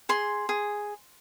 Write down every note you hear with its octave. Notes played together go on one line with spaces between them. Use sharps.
G#4 C6
G#4